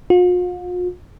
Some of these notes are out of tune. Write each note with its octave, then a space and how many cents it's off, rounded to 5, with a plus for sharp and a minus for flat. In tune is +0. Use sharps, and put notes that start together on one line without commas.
F4 +45